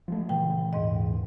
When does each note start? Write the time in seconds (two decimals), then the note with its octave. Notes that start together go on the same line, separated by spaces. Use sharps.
0.08 F3 G3 A3
0.29 A#2 C#3 E3 G5
0.73 D#2 G#2 D#5